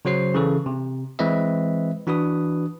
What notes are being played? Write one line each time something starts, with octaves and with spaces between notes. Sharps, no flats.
C#3 F#3 F#4 C5 C7
C#3 E3 A4
C3
E3 G#3 C4 B4 D#5 E5
E3 D4 F#4 B4 D#6